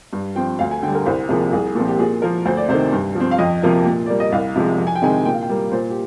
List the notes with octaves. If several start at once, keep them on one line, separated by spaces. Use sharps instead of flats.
G2
F3 C4 G5
D2 F5
G#5
D3 G3 G5
A#4
C2 C5
C3 F3 A#3 G#4
C2 G#4
A#2 F3 C4
G4
A#2 G#4
F3 A#3 A#4
D2 C5
D5
C3 D#3 C5
G2
F3
C4
F5
F2 D#5
C3 F3 A#3
A#2
G3 A#3 D5
D#5
C2 F5
C3 F3 G#3
F2
G#5
G5
C3 D#3 G#3 C4 G#5
A#2 G5
F5
G5
G3 A#3
A#2 C5
G4